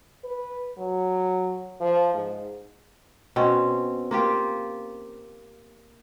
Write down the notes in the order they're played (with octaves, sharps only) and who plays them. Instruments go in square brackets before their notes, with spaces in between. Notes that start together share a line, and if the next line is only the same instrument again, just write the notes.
[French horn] B4
F#3
F3
G#2
[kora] B2 C4 C#4
A#3 F4 G4